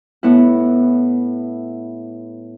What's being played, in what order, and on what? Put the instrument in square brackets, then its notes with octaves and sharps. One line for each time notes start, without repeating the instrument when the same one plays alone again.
[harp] A2 B3 E4